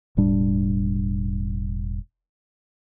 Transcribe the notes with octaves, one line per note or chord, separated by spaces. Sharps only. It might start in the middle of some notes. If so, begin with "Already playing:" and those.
E1 A2 G3 D4